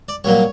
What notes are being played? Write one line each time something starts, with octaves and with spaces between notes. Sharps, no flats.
D5
C2 A#2 F#3 A#3 C#5